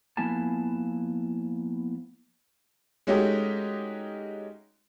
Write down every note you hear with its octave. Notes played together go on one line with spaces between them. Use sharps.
F3 A#3 B3 E4 G#5 A5
G#3 A3 C#4 D#4 F#4 G4